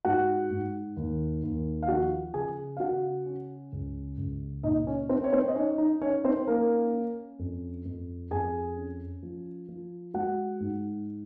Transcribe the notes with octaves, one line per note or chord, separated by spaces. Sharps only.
G#2 F#4 F#5
G#2
D#2
D#2
F5
F3 F#4 F#5
C#3 G#4 G#5
F5
C#3 F#4 F#5
C#4
C#2
C#2
A#2 D#4 D#5
C#4 C#5
C4 C5
C#5
C4 C5
D#5
C#4 D#4 C#5
D#4 D#5
C#4 D#4 C#5
C4 C5
A#3 C#4 A#4
C#4
F2
F2
F2 G#4 G#5
C#4
F3
F3
G#3 F#4 F#5
G#2